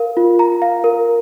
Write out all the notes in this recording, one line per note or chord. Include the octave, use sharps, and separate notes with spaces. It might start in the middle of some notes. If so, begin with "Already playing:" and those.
Already playing: A#4 F5
F4
A#5
F5
A#4